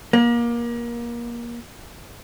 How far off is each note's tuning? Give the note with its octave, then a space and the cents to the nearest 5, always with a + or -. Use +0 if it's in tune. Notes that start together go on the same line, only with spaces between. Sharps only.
A#3 +25